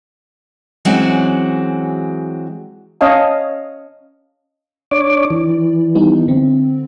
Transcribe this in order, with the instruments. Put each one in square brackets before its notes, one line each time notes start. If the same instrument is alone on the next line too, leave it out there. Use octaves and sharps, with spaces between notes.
[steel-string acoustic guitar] E3 F#3 G#3 C4 C#4 F#4
[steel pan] C#4 C#5 D#5 F5 A5
[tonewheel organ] D4 C#5 D6 [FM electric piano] D5
[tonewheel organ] E3
[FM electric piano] G3 B3 D#4
D3 C4